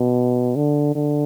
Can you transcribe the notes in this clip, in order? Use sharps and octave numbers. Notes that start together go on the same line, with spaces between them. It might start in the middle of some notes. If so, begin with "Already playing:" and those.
Already playing: B2
D3
D3